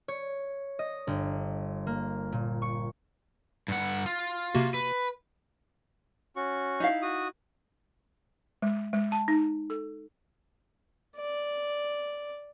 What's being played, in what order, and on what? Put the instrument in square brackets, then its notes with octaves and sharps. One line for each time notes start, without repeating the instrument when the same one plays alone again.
[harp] C#5
D#5
G1
A#3
A#2
C#6
[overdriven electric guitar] G2 F#5
F4
[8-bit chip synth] C3 A#3 F#4
[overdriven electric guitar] B4
[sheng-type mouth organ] C#4 F#4 C#6
[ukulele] D#4 E4 F5
[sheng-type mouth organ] F#4 D#6
[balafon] G#3
G#3
A5
D#4
A4
[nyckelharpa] D5